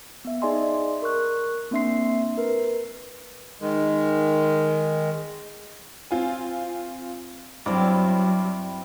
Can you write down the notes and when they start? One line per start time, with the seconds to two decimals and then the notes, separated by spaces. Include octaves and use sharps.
0.25 B3 E5
0.42 D#4 G#4 D5 D#5 G#5 C6
1.02 A#4 C#6 F#6
1.71 A#3 C4 D4 E5 C6 C7
2.38 A#4 B4
3.61 D#3 G#3
6.11 C4 F4 G#5
7.66 G2 F#3 C4 E4 D6